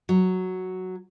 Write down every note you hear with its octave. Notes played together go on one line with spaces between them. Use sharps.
F#3